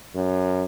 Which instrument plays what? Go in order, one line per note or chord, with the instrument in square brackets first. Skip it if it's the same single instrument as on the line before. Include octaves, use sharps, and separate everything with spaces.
[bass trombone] F#2